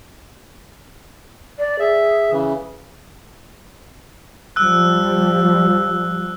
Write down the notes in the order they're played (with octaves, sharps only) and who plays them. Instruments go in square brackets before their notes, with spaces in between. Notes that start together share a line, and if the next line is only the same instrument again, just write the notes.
[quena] D5
[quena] G#4 [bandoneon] E5
[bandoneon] C#3 E3
[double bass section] F3 G3 [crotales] E6 F#6